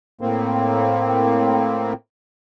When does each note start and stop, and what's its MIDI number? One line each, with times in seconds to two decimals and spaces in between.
0.21 1.93 45
0.21 1.93 58
0.21 1.93 60